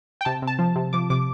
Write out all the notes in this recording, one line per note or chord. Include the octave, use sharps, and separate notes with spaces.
G5
C3 A5
C3
A5
F3
C3
F3 D6
C3 D6